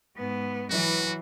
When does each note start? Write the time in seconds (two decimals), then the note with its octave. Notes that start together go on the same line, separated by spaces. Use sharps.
0.17 G#2 B3
0.71 E3 F#3 F#4